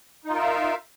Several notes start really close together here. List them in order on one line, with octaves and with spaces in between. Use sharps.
D#4 F4 A#4 E5 F5